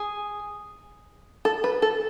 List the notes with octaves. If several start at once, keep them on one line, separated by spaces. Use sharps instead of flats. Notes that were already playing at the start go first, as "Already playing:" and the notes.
Already playing: G#4
A4
B4
A4